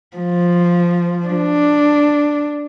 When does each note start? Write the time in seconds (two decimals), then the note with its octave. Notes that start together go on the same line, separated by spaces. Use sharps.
0.17 F3
1.28 D4